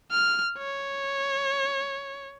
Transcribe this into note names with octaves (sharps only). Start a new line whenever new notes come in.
F6
C#5